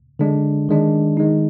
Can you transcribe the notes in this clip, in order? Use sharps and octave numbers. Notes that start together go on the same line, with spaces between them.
D3 G#3 D4
D#3 G#3 D4
D#3 G#3 D#4